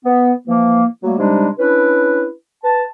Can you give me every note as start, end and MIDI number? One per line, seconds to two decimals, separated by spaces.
0.05 0.33 59
0.48 0.85 52
0.48 0.85 53
0.48 0.85 58
1.03 1.17 54
1.03 1.17 55
1.03 1.17 57
1.03 1.17 58
1.19 1.48 48
1.19 1.48 55
1.19 1.48 56
1.19 1.48 62
1.19 1.48 63
1.59 2.26 61
1.59 2.26 62
1.59 2.26 64
1.59 2.26 71
2.64 2.83 71
2.64 2.83 81